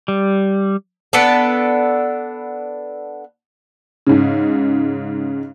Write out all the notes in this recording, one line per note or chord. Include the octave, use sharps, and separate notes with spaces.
G3
B3 D4 A4
G#2 C#3